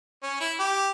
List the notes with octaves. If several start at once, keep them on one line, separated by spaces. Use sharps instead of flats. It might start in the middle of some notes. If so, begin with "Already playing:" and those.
C#4
E4
G4